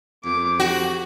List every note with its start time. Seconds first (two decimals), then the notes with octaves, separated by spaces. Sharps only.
0.24 F2 D6
0.60 F#4 G4